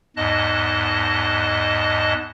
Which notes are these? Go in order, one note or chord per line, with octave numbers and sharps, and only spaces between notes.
E2 G#2 D#5 A5 F#6